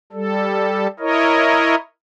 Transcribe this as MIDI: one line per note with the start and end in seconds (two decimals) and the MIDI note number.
0.13 0.87 55
0.13 0.87 69
1.00 1.75 64
1.00 1.75 70
1.00 1.75 73
1.00 1.75 75